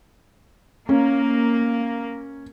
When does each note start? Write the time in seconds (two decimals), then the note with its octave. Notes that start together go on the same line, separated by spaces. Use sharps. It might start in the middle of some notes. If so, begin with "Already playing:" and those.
0.89 A#3 C#4